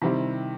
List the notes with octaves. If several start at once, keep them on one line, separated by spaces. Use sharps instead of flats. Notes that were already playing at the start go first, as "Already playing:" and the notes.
C3 D#3 G3 C4 E4